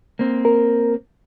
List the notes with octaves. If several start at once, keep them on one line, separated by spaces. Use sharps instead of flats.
A#3 C4
A#4